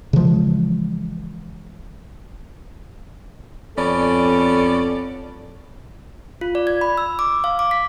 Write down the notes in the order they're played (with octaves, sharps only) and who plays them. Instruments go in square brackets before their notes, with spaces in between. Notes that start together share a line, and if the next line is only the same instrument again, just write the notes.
[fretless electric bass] C#3 E3 F3 G#3
[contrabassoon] F2 [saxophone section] B3 C#4 D5 [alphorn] A4
[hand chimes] F4
D5
G#6
B5
E6
D6
F5
D6
B6